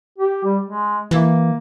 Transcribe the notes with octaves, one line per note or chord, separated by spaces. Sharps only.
G4
G3
G#3
E3 A#3